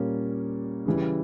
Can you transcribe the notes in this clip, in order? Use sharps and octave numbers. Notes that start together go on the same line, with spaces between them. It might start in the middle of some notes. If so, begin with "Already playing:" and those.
Already playing: A#2 G3 A#3 C#4
C#3 E3 G3